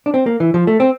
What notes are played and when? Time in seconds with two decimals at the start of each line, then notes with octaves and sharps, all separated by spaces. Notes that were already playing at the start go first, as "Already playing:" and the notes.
0.06 D4
0.14 C4
0.26 A#3
0.40 E3
0.54 F3
0.67 A3
0.80 C4